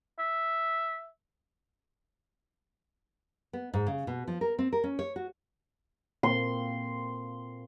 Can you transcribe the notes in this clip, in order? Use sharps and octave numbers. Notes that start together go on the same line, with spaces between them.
E5
B3
G#2
C#3
B2
F3
A#4
C4
A#4
C#4
C#5
F#4
A#2 A#3 C4 C6